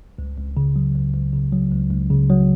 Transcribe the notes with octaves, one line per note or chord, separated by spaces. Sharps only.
C#2
C#2
C#3
F#3
C#2
C#2
C#3
F#3
C#2
C#2
C#3
F#3